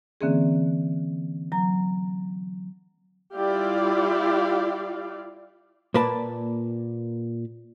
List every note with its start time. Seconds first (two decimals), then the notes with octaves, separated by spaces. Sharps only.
0.21 D3 E3 A#3 C4 C#4 G#4
1.52 F#3 A#5
3.34 G3 E4 F4 G4 D5 F5
5.94 A#2 A#3 B4 D5 A5